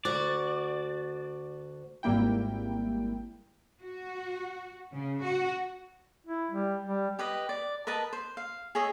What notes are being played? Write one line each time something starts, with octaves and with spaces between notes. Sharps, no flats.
D2 F#4 D5
G#1 G3 A#3 E4 G5
F#4
C#3
F#4
E4
G3
G3
G4 B4 D#5
D5
A#4 B4 D#5 A5
C5
F5
G#4 C#5 D#5 E5